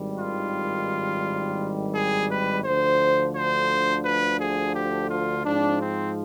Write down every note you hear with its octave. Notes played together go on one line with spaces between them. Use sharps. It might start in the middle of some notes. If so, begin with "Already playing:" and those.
Already playing: G#1 G2 D#3 G3
F4
G#4
B4
D2 D3 F3 C5
C5
B4
G#4
G4
F4
G#2 F3 C4 D4
C4